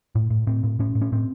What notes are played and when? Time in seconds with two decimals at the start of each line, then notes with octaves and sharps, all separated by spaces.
0.15 A2
0.30 A2
0.47 A2 C4
0.63 A2
0.79 A2 C#4
0.95 A2
1.02 C#4
1.12 A2 C4